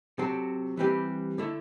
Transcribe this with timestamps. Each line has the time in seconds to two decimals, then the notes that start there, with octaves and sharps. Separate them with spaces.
0.18 C3 F#3 C4 F#4 A4
0.77 E3 G3 C4 G4 B4
1.38 D3 A3 E4